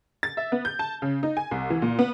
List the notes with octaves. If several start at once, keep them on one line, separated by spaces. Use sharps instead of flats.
A6
E5
B3
G6
A5
C#3
D#4
G#5
C2
E3
A#2
B3